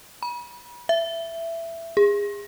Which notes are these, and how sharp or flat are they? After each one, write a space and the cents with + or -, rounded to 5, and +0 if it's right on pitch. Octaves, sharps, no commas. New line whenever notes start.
B5 -35
E5 +15
G#4 -30